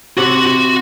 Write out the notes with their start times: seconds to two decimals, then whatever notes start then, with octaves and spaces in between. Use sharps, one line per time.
0.17 C3 F#4
0.47 F#4